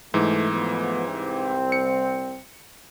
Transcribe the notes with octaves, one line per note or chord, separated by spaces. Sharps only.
G#2 E3 A3
F3 A3 B3
C2 C4
C#7